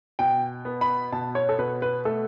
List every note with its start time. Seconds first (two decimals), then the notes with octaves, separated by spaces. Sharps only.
0.19 B2 G5
0.65 B3
0.81 B5
1.12 B2 A5
1.35 C#5
1.49 A4
1.59 B2 B4
1.82 B4
2.05 A3 A4